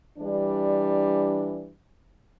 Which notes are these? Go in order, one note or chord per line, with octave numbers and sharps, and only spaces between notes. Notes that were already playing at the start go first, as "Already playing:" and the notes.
E3 G3 D4